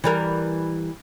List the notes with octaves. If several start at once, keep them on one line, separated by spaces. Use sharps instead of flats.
E3 G3 A#4